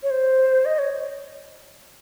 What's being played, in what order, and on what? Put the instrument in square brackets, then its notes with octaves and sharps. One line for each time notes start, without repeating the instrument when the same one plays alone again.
[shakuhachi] C#5
C5
D#5
C#5